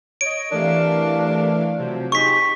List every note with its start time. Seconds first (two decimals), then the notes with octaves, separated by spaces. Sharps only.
0.21 C#5 D#5 D7
0.52 C3 E3 A3 D4 A#4 F5
1.79 C3 F3 F#3 C5
2.12 D#4 G4 G#4 C5 C#6 B6